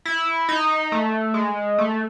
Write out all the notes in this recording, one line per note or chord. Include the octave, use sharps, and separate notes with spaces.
E4
D#4
A3
G#3
A3